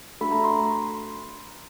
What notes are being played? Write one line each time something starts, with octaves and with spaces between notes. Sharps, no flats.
A3 D4 F#4 A4 B5
A#5
C6